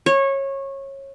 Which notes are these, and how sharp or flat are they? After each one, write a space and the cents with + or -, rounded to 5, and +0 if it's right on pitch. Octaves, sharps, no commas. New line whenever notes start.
C#5 -20